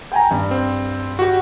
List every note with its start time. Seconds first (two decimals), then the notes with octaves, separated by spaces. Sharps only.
0.12 G5 G#5 A#5
0.31 G2
0.51 C4
1.19 F#4 G4